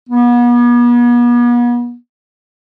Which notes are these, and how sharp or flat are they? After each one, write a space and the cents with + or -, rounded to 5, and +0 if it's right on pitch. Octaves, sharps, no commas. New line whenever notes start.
B3 -40